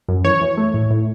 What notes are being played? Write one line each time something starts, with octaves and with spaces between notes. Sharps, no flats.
F#2
E3 C#5
E3
A3
A2
A2